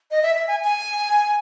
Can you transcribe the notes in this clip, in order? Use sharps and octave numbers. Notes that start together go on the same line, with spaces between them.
D#5
E5
E5
G#5
G#5